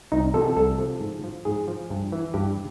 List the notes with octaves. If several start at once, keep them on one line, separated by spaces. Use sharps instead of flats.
C2 D#4
C3 F3 A4
A4
C2 A4
C3 F3
G#2
F3
G#2 G#4
F3
G2
E3
G2 G4